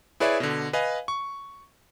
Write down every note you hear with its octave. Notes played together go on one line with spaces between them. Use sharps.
E4 G#4 B4 C#5 D5 E5
B2 D3
B4 D#5 F5 G#5
C#6